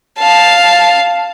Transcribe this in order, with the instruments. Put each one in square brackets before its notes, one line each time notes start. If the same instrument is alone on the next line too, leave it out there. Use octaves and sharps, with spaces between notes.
[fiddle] F5 A5